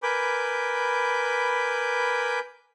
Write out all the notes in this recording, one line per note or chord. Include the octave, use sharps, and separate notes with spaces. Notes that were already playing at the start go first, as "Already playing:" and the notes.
A#4 B4 G#5 B5 D6 G6